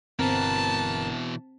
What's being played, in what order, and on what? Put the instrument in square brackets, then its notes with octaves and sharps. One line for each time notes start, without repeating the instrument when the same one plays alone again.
[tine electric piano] G1 A#4 A#5 [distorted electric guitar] B2 E3 [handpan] C4 [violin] A5